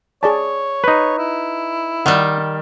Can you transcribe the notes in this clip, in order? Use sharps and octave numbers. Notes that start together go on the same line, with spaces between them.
G#4 C#5 D5 A5
D#4 B4
E4
D#3 G3 F#5